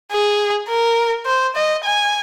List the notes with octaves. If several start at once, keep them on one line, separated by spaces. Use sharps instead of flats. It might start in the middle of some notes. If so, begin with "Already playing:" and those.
G#4
A#4
C5
D#5
G#5